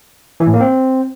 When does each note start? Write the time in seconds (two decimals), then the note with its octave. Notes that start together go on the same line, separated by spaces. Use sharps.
0.40 E3
0.47 A2
0.54 A#3
0.60 C4